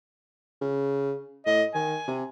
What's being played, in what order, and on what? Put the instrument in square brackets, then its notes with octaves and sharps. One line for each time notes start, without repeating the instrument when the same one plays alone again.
[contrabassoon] C#3
[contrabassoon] A2 [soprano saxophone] D#5
[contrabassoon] D#3 [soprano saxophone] G#5
[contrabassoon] C3